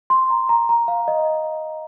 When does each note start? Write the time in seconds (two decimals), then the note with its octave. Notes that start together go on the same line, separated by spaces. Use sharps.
0.10 C6
0.30 A#5
0.49 A#5
0.69 A#5
0.88 F5
1.08 D#5